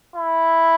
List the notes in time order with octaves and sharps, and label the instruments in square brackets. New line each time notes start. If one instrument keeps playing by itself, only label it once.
[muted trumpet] E4